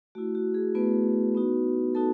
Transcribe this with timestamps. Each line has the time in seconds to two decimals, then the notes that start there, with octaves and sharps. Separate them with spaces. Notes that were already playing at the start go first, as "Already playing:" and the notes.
0.15 A3 E4 F#4
0.35 F#4
0.54 G#4
0.75 A3 B3 E4 B4
1.35 B3 D#4 F#4
1.95 B3 D#4 F#4 A4 A5